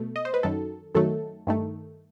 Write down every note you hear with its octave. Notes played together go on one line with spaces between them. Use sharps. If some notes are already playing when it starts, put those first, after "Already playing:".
Already playing: B2 A3
D#5
C5
B4
F#2 D#3 F#3 A4
F#2 D#3 F#3 A3 A4
G2 D#3 A3